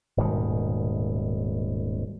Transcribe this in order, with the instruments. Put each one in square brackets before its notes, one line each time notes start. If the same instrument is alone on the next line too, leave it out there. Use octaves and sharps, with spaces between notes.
[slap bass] D#1 G#2 B2 D#3